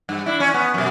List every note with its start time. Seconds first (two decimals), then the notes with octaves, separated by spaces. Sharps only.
0.09 G2
0.26 D4 E4
0.40 C#4
0.54 B3
0.74 F#2 B2